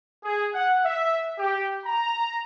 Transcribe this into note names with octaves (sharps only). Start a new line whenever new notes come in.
G#4
F#5
E5
G4
A#5